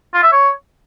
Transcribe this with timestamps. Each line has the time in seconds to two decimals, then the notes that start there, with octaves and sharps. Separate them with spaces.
0.14 F4
0.23 E5
0.32 C#5